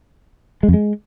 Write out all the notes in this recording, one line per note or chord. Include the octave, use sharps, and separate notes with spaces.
G#3
F2
G#3